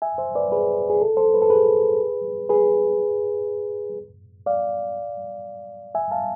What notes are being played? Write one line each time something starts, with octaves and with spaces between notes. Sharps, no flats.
E5 G#5
C5 E5
B4 D5
G#4 B4
G#4
A4
A4 C5
B4
A4
G#4 B4
G#4 B4
D5 F5
E5 G#5
F5 A5